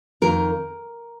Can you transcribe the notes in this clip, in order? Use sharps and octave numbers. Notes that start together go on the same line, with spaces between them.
F2 D#3 A#4